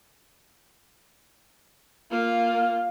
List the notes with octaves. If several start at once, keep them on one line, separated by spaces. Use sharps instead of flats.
A#3 F4 F5